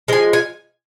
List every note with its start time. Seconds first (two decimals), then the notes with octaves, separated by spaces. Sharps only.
0.08 F3 G#3 G#5
0.33 G#5